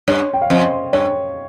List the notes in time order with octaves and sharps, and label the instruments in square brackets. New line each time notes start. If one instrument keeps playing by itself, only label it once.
[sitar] G2 [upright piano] C#5
[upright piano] G5
F5
[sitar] F2 [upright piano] C5 D#5
[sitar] G2 [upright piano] C#5